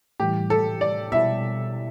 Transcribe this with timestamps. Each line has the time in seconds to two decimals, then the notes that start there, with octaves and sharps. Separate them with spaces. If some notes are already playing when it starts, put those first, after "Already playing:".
0.20 A2 E3 G3 G4
0.50 A4
0.81 D5
1.12 B2 G3 E4 E5